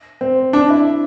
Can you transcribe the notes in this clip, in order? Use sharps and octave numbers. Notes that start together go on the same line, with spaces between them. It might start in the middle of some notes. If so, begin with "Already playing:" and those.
C4
D4
E4